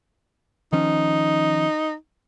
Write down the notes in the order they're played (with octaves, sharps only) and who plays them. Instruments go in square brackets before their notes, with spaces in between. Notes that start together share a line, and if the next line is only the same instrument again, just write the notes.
[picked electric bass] D#3 F3 C#4 [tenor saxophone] D#4